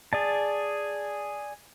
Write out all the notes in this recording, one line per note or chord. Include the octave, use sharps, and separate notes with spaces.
G#4 D5 A5